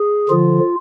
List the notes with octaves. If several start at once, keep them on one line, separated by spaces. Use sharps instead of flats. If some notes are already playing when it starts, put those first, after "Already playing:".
Already playing: G#4
D3 F3 F4